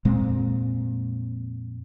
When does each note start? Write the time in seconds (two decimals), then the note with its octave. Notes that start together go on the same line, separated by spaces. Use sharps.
0.05 F2 A#2 G#3 C4